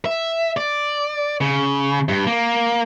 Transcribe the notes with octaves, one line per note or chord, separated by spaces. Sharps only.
E5
D5
C#3
G2
A#3